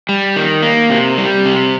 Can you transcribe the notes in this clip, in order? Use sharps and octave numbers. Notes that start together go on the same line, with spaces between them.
G3
D#3
A#3
C3
G3
C3